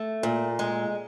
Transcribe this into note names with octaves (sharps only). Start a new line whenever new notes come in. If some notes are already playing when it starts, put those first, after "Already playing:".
Already playing: A3
A#2
G#3